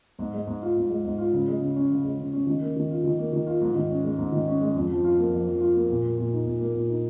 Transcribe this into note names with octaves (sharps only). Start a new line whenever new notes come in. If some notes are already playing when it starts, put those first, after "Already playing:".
G#2
G#3
G#2
F4
G#2
G#3
G#2
F4
C#3
G#3
C#3
C#4
C#3
G#3
C#3
C#4
D#3
A#3
D#3
F4
D#3
A#3
D#3
F4
G#2
D#3
C#4
G#3
G#2
D#3
C#4
G#3
F2
F3
F4
A#3
F2
F3
F4
A#3
A#2
A#3
A#2
D#4
A#2
A#3
A#2
D#4